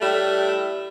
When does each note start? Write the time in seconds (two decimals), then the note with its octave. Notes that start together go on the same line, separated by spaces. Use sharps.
0.01 A2 G3 A3 E5